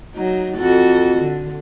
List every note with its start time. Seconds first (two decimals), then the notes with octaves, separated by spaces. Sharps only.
0.14 F#3 D#4
0.56 F2 F#4 A4
1.18 D3